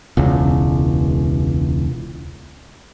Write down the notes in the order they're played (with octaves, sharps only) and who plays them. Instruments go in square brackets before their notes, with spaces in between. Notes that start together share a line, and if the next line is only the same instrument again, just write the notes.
[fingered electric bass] E1 C#2